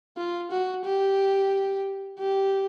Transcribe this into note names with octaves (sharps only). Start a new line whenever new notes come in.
F4
F#4
G4
G4